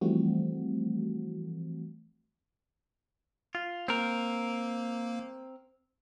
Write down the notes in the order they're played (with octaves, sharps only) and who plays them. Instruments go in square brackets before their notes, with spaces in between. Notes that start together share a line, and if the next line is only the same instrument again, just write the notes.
[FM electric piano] E3 F3 G3 A3 C4 F#4
[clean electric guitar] F4
[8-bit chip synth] A#3 [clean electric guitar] C4 A#4